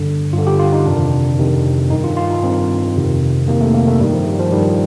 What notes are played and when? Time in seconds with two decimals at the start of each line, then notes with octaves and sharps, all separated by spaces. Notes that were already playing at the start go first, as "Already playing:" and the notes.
Already playing: G2 D3
0.33 G2 D3 F4
0.47 G4
0.59 F4
0.73 D#4
0.85 F2 C3 D#3 D4
1.38 F2 C3 D#3
1.90 G2 D#3 D#4
2.04 F4
2.17 F4
2.30 D#4
2.43 G2 D#3 C4
2.95 F2 C3 D#3
3.48 F2 C3 D#3 A#3
3.61 A3
3.74 A#3
3.87 A3
4.00 G2 G3
4.04 D#3
4.13 F3
4.27 G3
4.39 F3
4.52 G2 D#3 G3